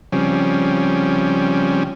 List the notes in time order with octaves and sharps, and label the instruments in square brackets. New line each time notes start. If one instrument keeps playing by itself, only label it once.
[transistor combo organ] C#3 F3 G3 C4 C#4